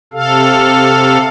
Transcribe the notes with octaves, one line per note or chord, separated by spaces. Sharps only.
C3 A4 F5